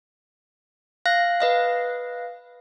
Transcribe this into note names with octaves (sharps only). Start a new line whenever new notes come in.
F5 F#6 A#6
B4 D#5 F5